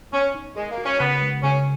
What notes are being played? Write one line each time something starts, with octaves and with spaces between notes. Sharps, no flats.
B3 C#4
D#4
G#3 A#4
A#3
F#4
C#4
C#3 B3
G#3
C#3 C#4